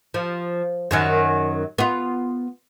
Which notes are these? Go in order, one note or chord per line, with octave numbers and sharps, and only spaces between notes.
F3
F#2 D#3 F#3
B3 F4